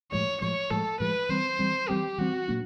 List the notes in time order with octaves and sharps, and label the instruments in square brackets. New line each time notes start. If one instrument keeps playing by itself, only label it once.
[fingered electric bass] A2 F3 G#3 [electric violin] C#5
[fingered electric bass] A2 F3 G#3 [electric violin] C#5
[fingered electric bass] A2 F3 G#3 [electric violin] A4
[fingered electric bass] A2 F3 G#3 [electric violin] B4
[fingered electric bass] E3 G3 C4 [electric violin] C5
[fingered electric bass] E3 G3 C4
[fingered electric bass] E3 G3 C4 [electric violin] G4
[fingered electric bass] E3 G3 C4 [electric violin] F#4
[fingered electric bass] A#2 F#3 A#3 D4